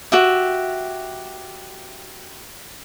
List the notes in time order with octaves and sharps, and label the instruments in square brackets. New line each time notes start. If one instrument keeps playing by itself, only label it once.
[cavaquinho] F#4 G4 E5